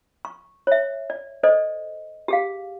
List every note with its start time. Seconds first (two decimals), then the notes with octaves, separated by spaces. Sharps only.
0.25 C#6
0.67 C#5 E5
1.10 D5
1.43 A4 C5 D5 D#5
2.28 G4 G#4 F5